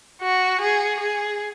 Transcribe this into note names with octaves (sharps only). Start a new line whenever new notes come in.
F#4
G#4
G#4